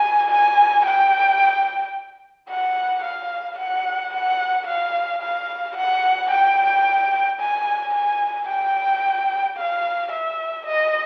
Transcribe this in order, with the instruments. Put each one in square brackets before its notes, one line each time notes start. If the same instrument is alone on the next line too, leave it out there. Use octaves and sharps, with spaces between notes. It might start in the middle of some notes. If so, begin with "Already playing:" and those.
Already playing: [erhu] G#5
G#5
G5
F#5
F5
F#5
F#5
F5
F5
F#5
G5
G#5
G#5
G5
F5
E5
D#5